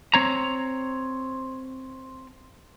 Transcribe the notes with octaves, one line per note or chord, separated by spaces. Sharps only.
C4 C#5 A#5